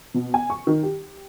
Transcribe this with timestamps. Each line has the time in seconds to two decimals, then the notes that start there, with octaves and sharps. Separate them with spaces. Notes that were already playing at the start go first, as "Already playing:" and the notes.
0.14 B2
0.34 G#5
0.50 C#6
0.67 D#3
0.83 G4